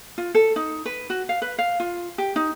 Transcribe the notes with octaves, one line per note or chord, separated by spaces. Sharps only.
F4
A4
D#4
B4
F#4
F5
B4
F5
F4
G4
D#4